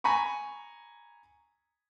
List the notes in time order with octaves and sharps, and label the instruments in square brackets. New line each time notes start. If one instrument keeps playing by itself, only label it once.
[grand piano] G#5 A#5 B5 C#6